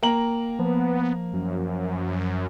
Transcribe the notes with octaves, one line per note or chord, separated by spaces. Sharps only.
A#3 G5 A#5 F#7
F3 B3
F#2